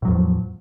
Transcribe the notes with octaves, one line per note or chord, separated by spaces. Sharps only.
E2 A2 F3 F#3